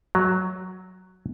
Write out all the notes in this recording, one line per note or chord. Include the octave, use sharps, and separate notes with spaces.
F#3